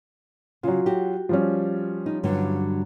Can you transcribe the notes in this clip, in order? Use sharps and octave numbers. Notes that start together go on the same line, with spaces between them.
C#3 F#3 F4
F#4 G4
F3 G3 C#4
D#4
G2 D3 F#3